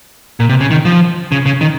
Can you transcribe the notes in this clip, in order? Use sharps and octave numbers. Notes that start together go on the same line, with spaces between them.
A#2
C3
C#3
D#3
F3
C#3
C#3
D#3